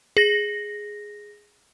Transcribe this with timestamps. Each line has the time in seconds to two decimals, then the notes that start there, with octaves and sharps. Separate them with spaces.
0.17 G#4 A#6